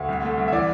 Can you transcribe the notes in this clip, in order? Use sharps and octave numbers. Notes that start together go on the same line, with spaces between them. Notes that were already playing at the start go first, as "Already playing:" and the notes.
Already playing: D2
C2
A3
C2
E5
E3 D5